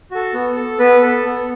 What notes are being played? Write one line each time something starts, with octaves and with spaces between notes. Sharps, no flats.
F#4 A4
B3
A4
B3 B4
A4
B3